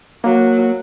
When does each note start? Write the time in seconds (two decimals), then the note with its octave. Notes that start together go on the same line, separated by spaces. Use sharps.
0.24 F#3 A#3